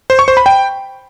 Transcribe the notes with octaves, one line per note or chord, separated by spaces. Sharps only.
C5
C#6
C5
B5
G5